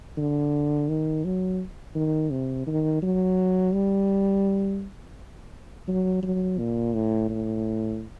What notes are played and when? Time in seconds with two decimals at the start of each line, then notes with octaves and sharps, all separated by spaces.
0.17 D3
0.89 D#3
1.25 F#3
1.95 D#3
2.31 C3
2.67 D#3
3.02 F#3
3.73 G3
5.88 F#3
6.23 F#3
6.59 A#2
6.94 A2
7.30 A2